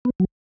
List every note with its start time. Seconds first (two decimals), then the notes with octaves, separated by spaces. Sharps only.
0.05 B3
0.20 F#3